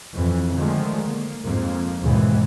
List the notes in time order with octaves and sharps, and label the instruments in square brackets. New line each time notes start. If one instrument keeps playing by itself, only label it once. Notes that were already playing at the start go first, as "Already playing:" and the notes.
[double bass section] F2 E3
D3 D#3 F3 G#3 A3
A#3
F2 G#2 F3 A#3
D#2 G#2 B2 E3 G#3